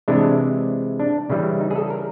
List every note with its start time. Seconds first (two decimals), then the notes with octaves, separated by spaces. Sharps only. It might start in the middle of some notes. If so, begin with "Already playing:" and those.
0.08 C3 E3 G#3 D4
1.00 D4
1.30 C#3 E3 G3
1.60 D#4
1.71 G#4
1.76 A4
1.90 A#4